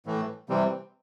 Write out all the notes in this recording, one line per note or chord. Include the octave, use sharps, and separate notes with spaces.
A2 E3 A3
C3 E3 G3 C4